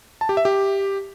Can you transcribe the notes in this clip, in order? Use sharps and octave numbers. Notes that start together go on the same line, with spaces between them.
A5
G4
E5
G4